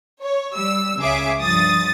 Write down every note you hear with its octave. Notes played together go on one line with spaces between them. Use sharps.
C#5
G3 E6
C#2 C#3 G#4 E5 D6
G2 F3 D#6 A6